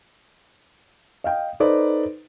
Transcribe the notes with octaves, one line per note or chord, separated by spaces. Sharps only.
D#5 F5 G5
D#4 A4 B4 C5 D5